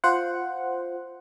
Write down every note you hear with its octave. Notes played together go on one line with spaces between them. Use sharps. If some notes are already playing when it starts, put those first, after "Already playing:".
F4 C5 F#5